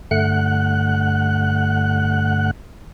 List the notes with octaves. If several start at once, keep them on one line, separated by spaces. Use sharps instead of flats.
G2 D3 A3 F#5 F#6